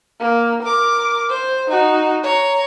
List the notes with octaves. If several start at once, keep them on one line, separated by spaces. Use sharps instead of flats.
A#3
A#4 D6
C5
D#4 F#4
C#5 A#5